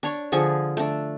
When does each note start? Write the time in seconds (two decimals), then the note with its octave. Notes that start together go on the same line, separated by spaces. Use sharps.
0.03 D4 C#5 C#6
0.32 D3 F3 G#4 C#6
0.77 A3 D4